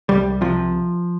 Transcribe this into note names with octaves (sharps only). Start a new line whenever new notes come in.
C2 G3
C3 F3